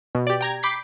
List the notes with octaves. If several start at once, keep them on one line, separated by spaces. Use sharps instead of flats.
B2
G4 D5
G5 A#5 G#6
B5 D6 G6 B6 C7